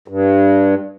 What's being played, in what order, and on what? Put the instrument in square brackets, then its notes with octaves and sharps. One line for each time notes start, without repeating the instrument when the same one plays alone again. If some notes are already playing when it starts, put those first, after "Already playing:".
[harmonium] G2